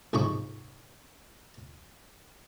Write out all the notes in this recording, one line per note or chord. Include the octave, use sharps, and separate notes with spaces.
A#1 G#2 C3 C#6 D6